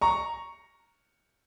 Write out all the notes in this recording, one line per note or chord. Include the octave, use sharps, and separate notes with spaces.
A#5 C#6